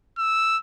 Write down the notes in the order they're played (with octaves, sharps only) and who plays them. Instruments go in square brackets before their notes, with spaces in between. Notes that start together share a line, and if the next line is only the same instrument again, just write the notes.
[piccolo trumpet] E6